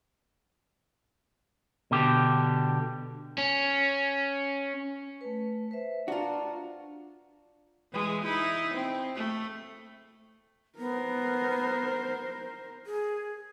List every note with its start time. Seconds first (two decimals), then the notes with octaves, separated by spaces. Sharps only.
1.91 B2 D3 G4
3.38 C#4
5.21 A3 B4
5.71 B4 C5 E5
6.08 D4 F4 F#4 A#5
7.92 E3 G#3
8.24 D#4 E4
8.74 C4
9.15 A3
10.78 B3 A#4 C5
12.86 G#4